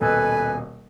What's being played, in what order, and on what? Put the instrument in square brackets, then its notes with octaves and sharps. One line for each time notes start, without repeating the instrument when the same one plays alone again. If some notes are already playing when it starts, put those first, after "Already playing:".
[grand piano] D#1 B2 D#5 [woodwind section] A4 B4 [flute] G#5